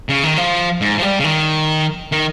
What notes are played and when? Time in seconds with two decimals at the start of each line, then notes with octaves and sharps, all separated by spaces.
0.09 C#3
0.24 D#3
0.37 F3
0.81 G#2
0.98 F3
1.02 G3
1.20 C#3
1.24 D#3
2.12 D#3